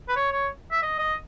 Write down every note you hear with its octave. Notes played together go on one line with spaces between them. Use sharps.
B4
C#5
C#5
E5
D#5
D#5